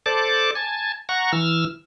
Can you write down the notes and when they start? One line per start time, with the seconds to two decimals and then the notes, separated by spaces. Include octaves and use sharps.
0.06 A4 C5 D5 A5 D6
0.55 G#5 A5
1.09 F#5 A#5 C#6
1.33 E3 E6 F6